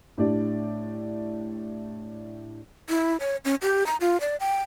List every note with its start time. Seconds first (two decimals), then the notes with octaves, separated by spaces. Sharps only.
0.18 A2 D4 G4 D5
2.89 E4
3.20 C#5
3.45 C#4
3.62 G4
3.86 A#5
4.00 F4
4.21 D5
4.40 G5